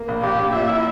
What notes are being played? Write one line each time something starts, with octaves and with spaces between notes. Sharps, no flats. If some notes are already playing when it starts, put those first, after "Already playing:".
Already playing: A#3
A#1
A#1 G4
A#1
A#2 E5
E4